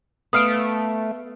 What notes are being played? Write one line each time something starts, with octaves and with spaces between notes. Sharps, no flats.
A3 B3 F5 D#6 F6 D7